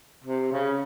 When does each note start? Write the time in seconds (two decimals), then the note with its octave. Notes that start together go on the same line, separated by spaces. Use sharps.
0.24 C3
0.51 C#3